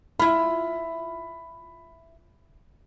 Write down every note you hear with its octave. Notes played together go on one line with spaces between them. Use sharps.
E4 F4 B5